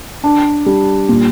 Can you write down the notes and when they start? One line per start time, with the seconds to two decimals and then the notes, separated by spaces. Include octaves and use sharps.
0.24 D4
0.66 G3
1.09 A#2